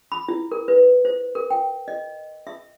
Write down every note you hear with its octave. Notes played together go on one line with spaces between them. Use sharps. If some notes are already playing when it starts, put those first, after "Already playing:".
B5
E4
A#4
B4
C5
A#4
G5
D#5
E5